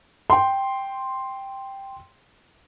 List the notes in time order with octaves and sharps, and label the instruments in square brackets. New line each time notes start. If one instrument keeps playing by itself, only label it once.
[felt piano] G5 C6